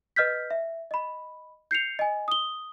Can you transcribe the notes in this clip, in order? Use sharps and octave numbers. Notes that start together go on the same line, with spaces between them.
B4 D#5 F6 G6 B6
E5
D#5 B5
G6 C7 C#7 F7
D#5 G#5
D#6 G7